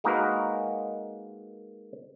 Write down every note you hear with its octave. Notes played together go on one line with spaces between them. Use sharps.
G#3 A#3 D#4 F#4 A#4 B4